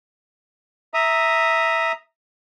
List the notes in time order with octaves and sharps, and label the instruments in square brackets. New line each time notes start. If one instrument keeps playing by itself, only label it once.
[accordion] E5 A#5 D#6